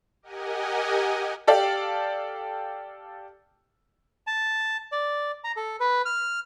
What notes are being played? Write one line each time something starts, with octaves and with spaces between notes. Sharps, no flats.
G4 A#4 D#5 F#5 G#5
G4 A4 D5 F5
A5
D5
A#5
A4
B4
F6